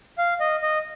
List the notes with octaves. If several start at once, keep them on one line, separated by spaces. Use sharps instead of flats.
F5
D#5
D#5